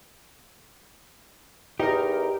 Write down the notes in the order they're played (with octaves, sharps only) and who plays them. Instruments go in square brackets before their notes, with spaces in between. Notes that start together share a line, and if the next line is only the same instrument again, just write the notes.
[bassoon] E2 [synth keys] D#4 A#4 [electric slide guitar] G4